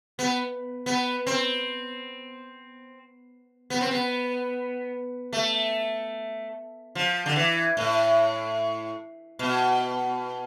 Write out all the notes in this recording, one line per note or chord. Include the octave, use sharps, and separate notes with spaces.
B3
B3
C4
B3
C4
B3
A3
F3
D3
E3
A2
B2